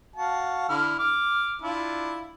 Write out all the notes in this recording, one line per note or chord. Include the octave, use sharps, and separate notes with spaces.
F#4 F5 A5
D3 E4 F6
D6 F6
D4 E4 F4